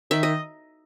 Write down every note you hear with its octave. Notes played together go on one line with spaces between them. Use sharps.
D#3 E5
D#5